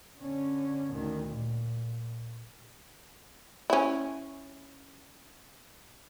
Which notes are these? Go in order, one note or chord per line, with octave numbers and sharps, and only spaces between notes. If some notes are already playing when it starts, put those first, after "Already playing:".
D3 C#4
D2 D#3
A#2
C#4 E4